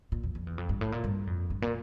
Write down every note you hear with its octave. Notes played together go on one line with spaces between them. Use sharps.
A#2
E2
F2
E2
F2
G2
A2
A#2
G2
F2
G2
A#2